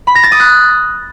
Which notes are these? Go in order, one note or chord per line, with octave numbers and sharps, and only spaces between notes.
B5
A#6
A6
D#6
F#6